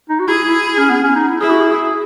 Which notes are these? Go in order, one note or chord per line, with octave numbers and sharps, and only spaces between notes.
D#4
F#4
E4 G#4
E4
E4
C#4
B3
C#4
D#4
E4
E4 G#4
F#4
G#4